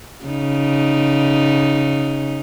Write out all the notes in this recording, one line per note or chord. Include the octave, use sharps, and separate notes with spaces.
C#3 D#4